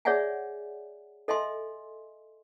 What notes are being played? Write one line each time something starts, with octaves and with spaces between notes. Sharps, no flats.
G#4 C#5 D5 E5 F#5 G#5
A4 D#5 E5 G#5 C6